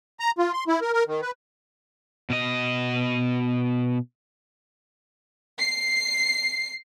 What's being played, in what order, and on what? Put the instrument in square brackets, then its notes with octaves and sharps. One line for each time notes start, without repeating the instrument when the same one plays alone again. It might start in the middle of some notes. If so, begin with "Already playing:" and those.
[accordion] A#5
F4
C6
E4
A#4
A#4
D#3
B4
[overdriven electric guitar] B2 D#5
[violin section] C7